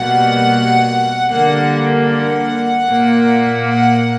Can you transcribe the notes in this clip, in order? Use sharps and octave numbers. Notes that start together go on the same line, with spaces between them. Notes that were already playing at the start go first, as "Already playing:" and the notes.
Already playing: B2 G3 A#3 F#5
D3 G3 A#3 F#5
F#5
A#2 A#3
F#5